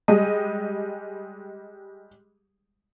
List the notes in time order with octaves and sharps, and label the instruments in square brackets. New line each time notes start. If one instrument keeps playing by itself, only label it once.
[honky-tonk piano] G3 G#3 D#5